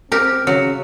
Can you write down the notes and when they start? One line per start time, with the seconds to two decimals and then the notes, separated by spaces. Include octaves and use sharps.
0.12 C4 G4 A#4
0.47 C#3 F#3